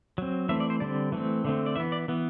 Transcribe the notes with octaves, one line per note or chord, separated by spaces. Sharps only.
F#3 C4
E3 A3 C4 E5
D5
C5
D3 G3 C4 D5
E3 A3 C4
D3 A3 C4
D5
E3 B3 E5
D5
E3 B3